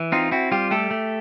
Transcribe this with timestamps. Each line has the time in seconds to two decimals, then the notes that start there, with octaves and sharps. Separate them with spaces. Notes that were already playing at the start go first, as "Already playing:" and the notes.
Already playing: E3
0.12 C4 D#4 F4
0.31 C4 E4 F#4
0.51 G3 F4 G4
0.71 A3 G4 A4
0.91 A3